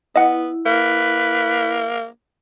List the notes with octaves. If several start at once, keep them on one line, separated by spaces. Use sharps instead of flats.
B3 E4 D#5 F#5
A#3 B4